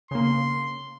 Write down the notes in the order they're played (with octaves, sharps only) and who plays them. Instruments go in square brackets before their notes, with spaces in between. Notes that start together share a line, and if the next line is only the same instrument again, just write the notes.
[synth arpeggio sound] C#3 A#3 [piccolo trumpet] C6